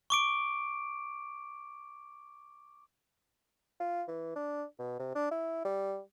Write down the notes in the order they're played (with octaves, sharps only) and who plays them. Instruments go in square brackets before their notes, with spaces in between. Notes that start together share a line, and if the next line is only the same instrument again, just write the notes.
[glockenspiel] C#6 D6 D7
[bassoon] F4
E3
D4
B2
C3
D4
E4
G3